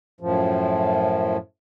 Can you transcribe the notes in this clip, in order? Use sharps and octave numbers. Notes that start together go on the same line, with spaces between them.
F#2 A2 F3